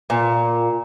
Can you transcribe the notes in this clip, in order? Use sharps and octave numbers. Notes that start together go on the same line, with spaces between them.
A#2